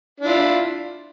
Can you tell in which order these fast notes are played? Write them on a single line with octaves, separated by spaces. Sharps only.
D4 E4 F4